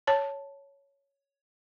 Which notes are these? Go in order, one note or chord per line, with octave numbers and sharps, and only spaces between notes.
C#5 A5